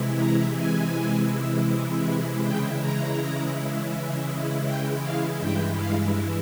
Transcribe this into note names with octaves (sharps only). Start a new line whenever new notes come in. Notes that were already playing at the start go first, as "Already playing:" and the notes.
Already playing: C3 E3 G#3 E4
A#5
G#5
C#3 E3 G#3 E4 G5
A#5
G5
F5
G2 E3 G#3 E4 G5
F5